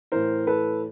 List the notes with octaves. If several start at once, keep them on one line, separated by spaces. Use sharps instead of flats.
A2 E3 A#4 C5
A4 B4